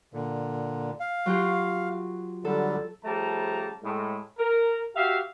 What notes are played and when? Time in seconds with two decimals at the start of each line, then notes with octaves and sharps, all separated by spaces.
0.14 A#2 D3
1.00 F5
1.26 F#3 F4 G4
2.45 D3 F#3 G3 A4
3.04 C#3 F3 G3 A3 A5 A#5
3.83 A2 G#3
4.38 A#4
4.96 F#4 G4 E5 F5